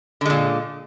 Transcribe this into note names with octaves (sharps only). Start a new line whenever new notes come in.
A#2 D3 G#3